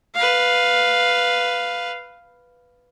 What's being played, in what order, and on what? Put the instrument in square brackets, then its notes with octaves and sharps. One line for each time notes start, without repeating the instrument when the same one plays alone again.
[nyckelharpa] B4 F5